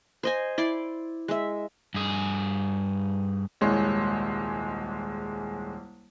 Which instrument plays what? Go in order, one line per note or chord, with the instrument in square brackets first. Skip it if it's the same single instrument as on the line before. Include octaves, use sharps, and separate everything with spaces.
[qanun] C5 D#5 G#5
E4 D5 C6
G#3 E5
[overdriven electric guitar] G2 G#4
[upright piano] D#1 C2 G#3 C#5 C6